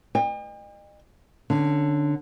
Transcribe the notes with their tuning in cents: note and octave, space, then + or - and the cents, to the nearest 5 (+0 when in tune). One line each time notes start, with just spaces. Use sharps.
D#5 -40 G5 +45
D3 +10 C#4 +0